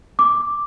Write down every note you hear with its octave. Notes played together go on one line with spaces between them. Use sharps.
D6